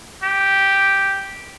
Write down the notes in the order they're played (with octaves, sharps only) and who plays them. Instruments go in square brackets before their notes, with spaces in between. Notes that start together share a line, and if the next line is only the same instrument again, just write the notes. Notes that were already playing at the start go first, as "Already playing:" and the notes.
[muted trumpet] G4